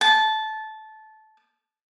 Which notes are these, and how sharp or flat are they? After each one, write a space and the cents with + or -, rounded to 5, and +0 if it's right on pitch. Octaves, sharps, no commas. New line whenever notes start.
A5 -15